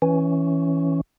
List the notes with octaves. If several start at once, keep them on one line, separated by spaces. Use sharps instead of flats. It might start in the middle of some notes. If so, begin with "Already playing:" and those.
E3 C#4